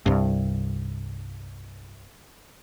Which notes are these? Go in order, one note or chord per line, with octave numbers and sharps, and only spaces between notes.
C2 G2